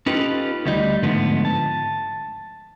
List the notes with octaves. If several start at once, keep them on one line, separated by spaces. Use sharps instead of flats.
C#4 D#4 F4 G4 A4 B4
D2 G3 D#4
G#2 D3 F3 A3 B3
A5